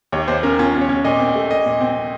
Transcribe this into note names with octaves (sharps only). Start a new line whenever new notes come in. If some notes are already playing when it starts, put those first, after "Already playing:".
D#2 C#5
D#2 C5
C#4 A#4
C#4 F4
C#4
C#5
C#4
A#2 D#5
C4
A3
A#2 D#5
A#2
C4